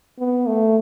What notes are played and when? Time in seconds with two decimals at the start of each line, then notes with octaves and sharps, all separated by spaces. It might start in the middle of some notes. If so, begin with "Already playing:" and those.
0.19 B3
0.47 A3